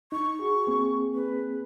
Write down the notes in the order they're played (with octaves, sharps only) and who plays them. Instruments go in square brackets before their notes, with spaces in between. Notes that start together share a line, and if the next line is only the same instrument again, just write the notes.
[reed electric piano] D#4 [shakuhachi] C#6
[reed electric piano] F#4 G#4
A#3 C4 G#4
[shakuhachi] B4